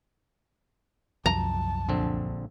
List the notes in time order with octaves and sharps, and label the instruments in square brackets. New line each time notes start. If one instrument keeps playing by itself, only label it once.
[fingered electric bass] C2 F#2 F3 [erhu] A5 [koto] A#5
[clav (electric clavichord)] A#1 D3 C4